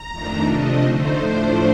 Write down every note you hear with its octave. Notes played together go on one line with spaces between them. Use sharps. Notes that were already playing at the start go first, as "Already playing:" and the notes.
Already playing: A#5
F2 D#3 A3 D4
C3 F3 A3 D4 D#5
D3 A3 D#4 C5
A2 F3 A3 D4 C5